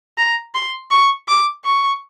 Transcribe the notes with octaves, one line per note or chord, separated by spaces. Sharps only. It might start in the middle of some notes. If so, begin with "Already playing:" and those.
A#5
C6
C#6
D6
C#6